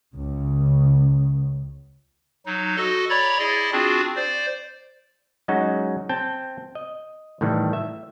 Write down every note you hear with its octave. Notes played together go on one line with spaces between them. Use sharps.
C#2 C#3
F#3 D#4
F#4 A4 D#5
C#5 D5 A#5 B5 G#6 A6
E4 G#4 D5 D#5
C4 D4 F4 F#4 G#4
C5 D5
F#3 G#3 C#4 D#4 F#4
C4 G5 A5
D#5
A2 D#3 E3 G3
E5